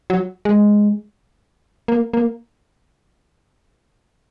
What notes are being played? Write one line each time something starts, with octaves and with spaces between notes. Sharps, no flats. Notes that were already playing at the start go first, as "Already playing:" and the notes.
F#3
G#3
A#3
A#3